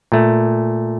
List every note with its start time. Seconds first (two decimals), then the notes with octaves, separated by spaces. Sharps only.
0.12 A#2 A3